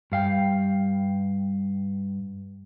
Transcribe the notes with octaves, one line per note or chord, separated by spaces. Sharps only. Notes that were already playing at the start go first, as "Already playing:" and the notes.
G2 F5 G5